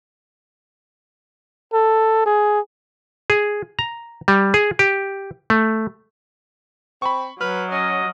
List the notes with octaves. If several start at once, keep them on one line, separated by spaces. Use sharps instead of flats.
A4
G#4
G#4
A#5
G3
G#4
G4
A3
C4 B5 C#6
F#3 B4 F6
C#4 D#5